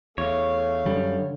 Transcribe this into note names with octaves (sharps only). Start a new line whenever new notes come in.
E2 A3 C#5 F5
F#2 D3 G3